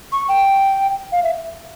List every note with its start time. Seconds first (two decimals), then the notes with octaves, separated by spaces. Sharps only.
0.12 C#6
0.29 G5
1.12 F5
1.23 E5